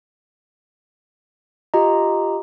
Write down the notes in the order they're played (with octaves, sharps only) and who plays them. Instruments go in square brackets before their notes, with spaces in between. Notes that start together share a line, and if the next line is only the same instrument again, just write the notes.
[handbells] F4 G4 D#5 A#5